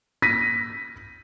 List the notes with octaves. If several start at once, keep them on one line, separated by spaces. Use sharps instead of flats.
A#6 B6 D#7